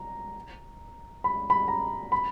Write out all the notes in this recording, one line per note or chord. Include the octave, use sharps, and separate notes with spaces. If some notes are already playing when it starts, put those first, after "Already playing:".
Already playing: A#5
B5
B5
A#5
B5